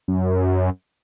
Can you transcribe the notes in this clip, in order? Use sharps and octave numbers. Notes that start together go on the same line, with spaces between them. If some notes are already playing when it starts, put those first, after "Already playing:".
F#2